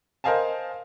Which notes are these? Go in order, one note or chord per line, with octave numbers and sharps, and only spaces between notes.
A#4 C5 D#5 F5 G#5 A5